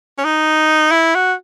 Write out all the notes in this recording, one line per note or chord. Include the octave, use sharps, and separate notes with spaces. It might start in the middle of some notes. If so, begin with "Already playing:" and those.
C#4
D#4
E4
F#4